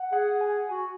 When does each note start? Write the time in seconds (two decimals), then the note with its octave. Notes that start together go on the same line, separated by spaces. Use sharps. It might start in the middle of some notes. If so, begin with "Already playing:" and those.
Already playing: F#5
0.12 G#4 F#5
0.41 G#5
0.69 F#4 G#5